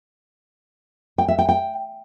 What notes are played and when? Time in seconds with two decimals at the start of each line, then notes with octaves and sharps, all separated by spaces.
1.18 G5
1.28 E5
1.38 G5
1.49 G5